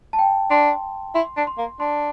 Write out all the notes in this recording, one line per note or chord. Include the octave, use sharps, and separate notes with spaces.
A5
G5
D4 C6
E4 C6
D4
C6
A#3
D4 C6